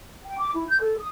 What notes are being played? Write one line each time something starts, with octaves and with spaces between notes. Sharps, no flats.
G5
D6
E4
G6
A4
D#6